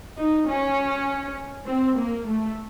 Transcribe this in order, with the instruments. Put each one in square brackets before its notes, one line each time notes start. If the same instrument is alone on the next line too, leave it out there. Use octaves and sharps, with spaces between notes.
[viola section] D#4
C#4
C4
A#3
A3